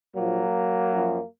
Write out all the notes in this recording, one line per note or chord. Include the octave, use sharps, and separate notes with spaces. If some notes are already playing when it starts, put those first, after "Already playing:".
A#1 A#2 F3 F#3 A#3
F#2 F3